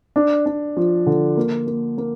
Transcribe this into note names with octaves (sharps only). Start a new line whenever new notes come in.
D4
D4
F3
D3
A#3
A#3
A#3